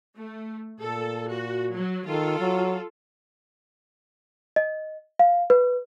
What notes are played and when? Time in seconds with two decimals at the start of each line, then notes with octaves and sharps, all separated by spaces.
0.17 A3
0.80 A#2 A4
1.32 F#4
1.75 F#3
2.06 D#3 F4 A4
2.40 F#3
4.56 D#5
5.19 F5
5.50 B4